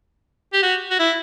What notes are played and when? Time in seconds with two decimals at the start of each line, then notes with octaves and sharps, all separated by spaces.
0.54 G4
0.63 F#4
0.91 F#4
1.00 E4